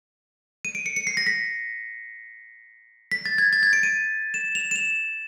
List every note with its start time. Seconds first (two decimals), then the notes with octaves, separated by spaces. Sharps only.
0.65 D#7
0.75 D7
0.86 C#7
0.96 C#7
1.07 C7
1.17 A#6
1.26 B6
3.12 B6
3.26 A6
3.38 G#6
3.53 A6
3.63 G#6
3.73 D7
3.83 D#7
4.34 E7
4.55 F7
4.71 E7
4.76 F7